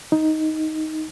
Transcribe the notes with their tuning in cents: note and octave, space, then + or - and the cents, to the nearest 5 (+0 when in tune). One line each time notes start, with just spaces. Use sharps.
D#4 +10